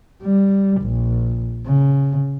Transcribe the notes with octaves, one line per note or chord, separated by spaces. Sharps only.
G3
A#1
C#3